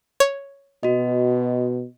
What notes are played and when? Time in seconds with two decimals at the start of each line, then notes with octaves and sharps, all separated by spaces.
0.20 C#5
0.83 B2 F#4 D#5